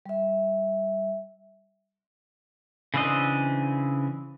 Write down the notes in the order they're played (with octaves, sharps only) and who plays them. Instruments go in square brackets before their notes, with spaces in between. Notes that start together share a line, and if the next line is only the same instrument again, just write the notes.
[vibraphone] G3 E5
[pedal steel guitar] C#3 E3 C4 D4 D#5